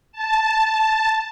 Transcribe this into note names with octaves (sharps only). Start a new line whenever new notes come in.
A5